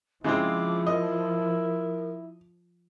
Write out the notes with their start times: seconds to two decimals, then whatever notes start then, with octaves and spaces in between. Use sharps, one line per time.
0.24 C#3 F3 G#3 C4 E4 D6
0.87 A#4 D#5